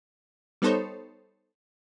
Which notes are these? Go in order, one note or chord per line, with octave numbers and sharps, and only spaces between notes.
G3 B3 D#4 A4 C5 C#5